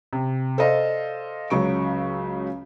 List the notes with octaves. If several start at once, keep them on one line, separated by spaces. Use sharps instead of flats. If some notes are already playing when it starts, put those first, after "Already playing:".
C3
A4 C5 D5 D#5 F5
C#2 C#3 F#3 C#6 D7